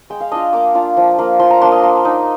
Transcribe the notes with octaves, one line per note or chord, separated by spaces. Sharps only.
G#3 G5
F5
D4 F4 D#5
A#3 D6
D4 F4
F3
A#3 F4
F3 C6
A#5
A#3 D4 C6
D#5
A#3
D#4